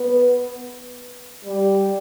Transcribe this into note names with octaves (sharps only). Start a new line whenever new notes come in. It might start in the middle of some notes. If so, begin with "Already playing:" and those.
Already playing: B3
G3